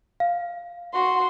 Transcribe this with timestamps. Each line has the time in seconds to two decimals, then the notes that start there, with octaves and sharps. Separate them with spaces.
0.20 F5
0.93 F#4 C6